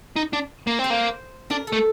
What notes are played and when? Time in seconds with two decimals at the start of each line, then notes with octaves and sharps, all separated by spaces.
0.16 D#4
0.33 D4
0.67 A#3
0.79 C4
0.84 C5
0.90 A#3
1.50 D4 A#4
1.67 A4
1.73 A3